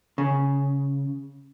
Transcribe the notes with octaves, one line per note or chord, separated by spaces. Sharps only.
C#3